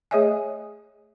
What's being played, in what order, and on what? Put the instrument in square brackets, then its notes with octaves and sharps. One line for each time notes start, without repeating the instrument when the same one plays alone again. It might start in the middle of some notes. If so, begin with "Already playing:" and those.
[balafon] A3 G#4 C#5 D#5 E5 G#5